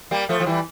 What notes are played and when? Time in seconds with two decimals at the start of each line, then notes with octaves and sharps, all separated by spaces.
0.11 G3 A#3
0.29 F3 A3
0.40 F3
0.46 E3 G3